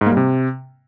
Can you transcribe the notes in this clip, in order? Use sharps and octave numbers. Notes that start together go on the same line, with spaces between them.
G#2
A#3
G3
C3